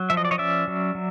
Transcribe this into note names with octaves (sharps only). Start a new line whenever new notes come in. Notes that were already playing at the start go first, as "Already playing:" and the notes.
Already playing: F#3
F3 E5
D#5
D5
C#5 D#5
C#4 D5 E5
F#3
F#3